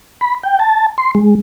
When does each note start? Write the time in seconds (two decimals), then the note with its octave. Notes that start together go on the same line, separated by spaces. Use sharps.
0.21 B5
0.43 G5
0.60 A5
0.98 C6
1.15 G#3